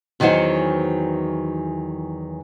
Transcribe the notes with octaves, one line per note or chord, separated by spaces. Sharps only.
E2 D#3 E3 F#3 C5 F#5